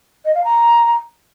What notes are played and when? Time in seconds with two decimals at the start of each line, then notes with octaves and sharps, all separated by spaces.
0.25 D#5
0.34 F5
0.44 A#5